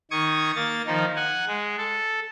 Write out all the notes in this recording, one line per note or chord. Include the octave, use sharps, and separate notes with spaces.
D#3 C#6 D#6 G#6
A#3 A6
D#3 F3 D#4
F#5 G#5
G#3
A4